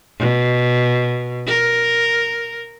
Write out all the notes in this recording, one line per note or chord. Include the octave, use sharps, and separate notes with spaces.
B2
A#4